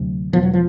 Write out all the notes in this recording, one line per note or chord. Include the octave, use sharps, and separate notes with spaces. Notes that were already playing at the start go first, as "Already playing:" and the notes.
Already playing: D2 C3 F#3
E1 E2 B2 F3
F#3
F3